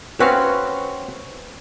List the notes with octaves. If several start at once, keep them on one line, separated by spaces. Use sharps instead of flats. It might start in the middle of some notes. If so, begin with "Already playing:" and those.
C4 C#4 F#4 B4 F5